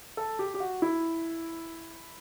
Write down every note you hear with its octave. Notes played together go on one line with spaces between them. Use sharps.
A4
G4
G4
F#4
E4